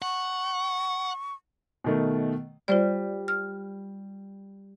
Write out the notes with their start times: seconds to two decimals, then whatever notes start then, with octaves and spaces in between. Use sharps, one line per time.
0.02 F#5 C#6
1.84 B2 D#3 A3
2.68 G3 F4 C5 D5
3.28 F6